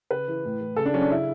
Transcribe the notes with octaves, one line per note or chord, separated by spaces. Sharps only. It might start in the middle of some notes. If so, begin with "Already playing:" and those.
C#3 B4
E3
A2
E3
C#3 A4
D4
F#3 C#4
D4
C#3 E4